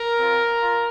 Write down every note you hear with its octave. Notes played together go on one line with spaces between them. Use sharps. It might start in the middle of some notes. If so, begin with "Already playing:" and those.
Already playing: A#4
C4 F4
F4